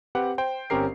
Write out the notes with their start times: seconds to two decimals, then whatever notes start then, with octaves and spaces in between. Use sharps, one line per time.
0.15 C4 G4 B4 F#5
0.38 C5 G5
0.70 G1 C4 C#4 G4 A#4 C7